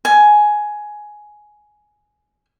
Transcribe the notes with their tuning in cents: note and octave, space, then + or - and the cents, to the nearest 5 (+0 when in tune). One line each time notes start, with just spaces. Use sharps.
G#5 +10